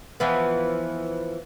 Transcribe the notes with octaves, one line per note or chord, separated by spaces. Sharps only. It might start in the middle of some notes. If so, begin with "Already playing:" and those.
E3 F3 B3